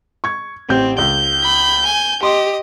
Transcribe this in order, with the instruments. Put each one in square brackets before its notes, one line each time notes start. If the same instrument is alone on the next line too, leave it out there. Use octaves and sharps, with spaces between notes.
[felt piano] C#6 G#6
[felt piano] A1 G4 G6 [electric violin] C4
[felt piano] C#2 [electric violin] G6
[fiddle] B5
G#5
[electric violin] G4 [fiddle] D#5 [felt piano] C6